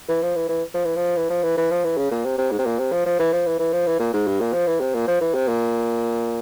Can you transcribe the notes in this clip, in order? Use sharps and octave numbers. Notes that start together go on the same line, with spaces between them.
E3
F3
E3
E3
F3
E3
F3
E3
F3
E3
E3
F3
E3
C#3
A#2
C3
C3
G#2
C3
A#2
C3
F3
F3
E3
F3
E3
E3
F3
E3
A#2
G#2
G2
A#2
F3
E3
C3
A#2
F3
E3
C3
A#2